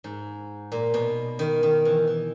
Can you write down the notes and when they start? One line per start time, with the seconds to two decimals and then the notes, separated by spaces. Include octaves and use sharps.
0.04 G#2
0.72 A#2
0.94 B2
1.39 D#3
1.63 D#3
1.85 E3
2.07 E3